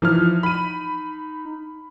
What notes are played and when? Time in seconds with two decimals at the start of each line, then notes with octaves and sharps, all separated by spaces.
0.02 E3 F3 D#4 F6
0.43 B5 D#7